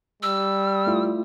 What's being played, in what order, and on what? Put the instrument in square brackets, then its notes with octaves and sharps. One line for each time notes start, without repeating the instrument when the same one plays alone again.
[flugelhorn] G3 [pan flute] E6
[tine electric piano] A3 E4 F4